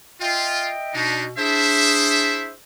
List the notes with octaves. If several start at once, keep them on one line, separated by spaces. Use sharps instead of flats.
F4 D#5 E5 G5
B2 D4 D#4
D4 E4 G#4 C5 E5